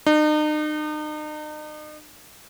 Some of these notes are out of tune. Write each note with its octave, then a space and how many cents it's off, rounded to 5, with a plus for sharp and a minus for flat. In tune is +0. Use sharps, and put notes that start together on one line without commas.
D#4 -40